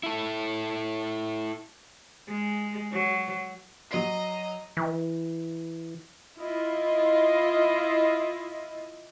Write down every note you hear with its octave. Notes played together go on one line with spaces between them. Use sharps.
E4 A4
G#3
F#3
F#3 D#5 A#5 C7
E3
E4 F4 D#5